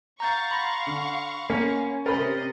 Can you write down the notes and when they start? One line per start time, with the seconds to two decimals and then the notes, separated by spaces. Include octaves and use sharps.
0.20 F5 F#5 A#5 C#6 G6 A6
0.51 B5 C6 A#6
0.86 D3
1.50 A#3 C#4
2.06 C3 A#4 C5 D#5 B5 A6